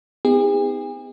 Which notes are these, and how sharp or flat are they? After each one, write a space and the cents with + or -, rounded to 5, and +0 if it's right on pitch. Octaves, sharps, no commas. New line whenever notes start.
B3 +40 D#4 +25 G#4 -45